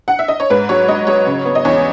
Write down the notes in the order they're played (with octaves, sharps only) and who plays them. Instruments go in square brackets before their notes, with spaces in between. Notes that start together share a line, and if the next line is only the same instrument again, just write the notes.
[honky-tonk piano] F#5
E5
D#5
C#5
G#2 B4
F#3 C#5
F#3 D#5
F#3 C#5
C#3
B3
D#5
E2 C#5